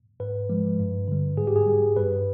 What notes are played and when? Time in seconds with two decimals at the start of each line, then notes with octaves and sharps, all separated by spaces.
0.20 G#2 B4
0.49 F3 G#3
0.80 G2
1.08 D3 G3
1.37 G#2 G#4
1.47 G4
1.56 G#4
1.66 G3
1.96 G2 B4